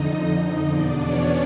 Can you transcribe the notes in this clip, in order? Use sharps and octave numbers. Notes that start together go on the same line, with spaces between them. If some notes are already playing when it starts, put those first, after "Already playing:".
Already playing: F2 D3 D#4 D#5
D#4 D#5
E2 B2 D4 D5
C#4 C#5